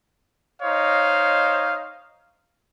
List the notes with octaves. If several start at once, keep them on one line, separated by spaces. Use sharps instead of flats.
D#4 C5 C#5 D#5 F5